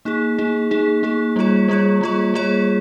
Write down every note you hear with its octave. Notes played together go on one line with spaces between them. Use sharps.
A#3 D#4 G#4
A#3 D#4 G#4
A#3 D#4 G#4
A#3 D#4 G#4
G3 A#3 F4 G#4 C#5
G3 A#3 F4 G#4 C#5
G3 A#3 F4 G#4 C#5
G3 A#3 F4 G#4 C#5